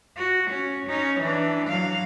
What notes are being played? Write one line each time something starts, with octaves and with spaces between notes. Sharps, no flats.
F#4
C#4
C#4 D#4
E3 D4
F#3 F5